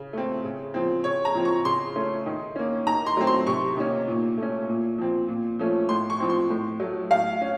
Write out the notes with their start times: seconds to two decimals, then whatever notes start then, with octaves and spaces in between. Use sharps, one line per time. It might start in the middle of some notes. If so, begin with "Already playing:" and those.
Already playing: C#3
0.13 A3 C4
0.44 C#3
0.74 F3 C4
1.04 C#3 C#5
1.25 A#5
1.35 F3 C4
1.45 C#6
1.65 C#3 C6
1.95 A3 C#4
2.26 D#3
2.56 A#3 C#4
2.86 D#3 A#5
3.06 C6
3.17 F#3 A3 C4
3.27 C6
3.47 C3 C#6
3.77 D#3 A#3 C#4
4.08 A#2
4.38 A3 C#4
4.68 A#2
4.98 F3 C4
5.28 A#2
5.59 F3 A3 C#4
5.89 A2 C6
6.10 C#6
6.20 F3 C4
6.30 C6
6.50 A2
6.80 F#3 A3
7.10 A2 F5
7.41 C#4